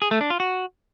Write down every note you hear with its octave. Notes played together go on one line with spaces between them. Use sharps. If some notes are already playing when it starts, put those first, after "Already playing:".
G#4
A3
D4
F4
F#4